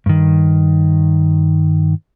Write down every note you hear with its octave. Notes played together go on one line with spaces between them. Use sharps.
G2 D#3